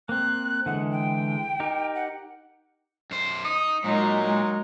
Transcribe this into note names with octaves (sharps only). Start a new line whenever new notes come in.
A#3 C4 F#6
D3 E3 G#3 F#5
G5
D#4 G4 A#4
F#5
F#2 C5
D#4 D#6
A#2 F#3 G#3 D#4 A#4
G#3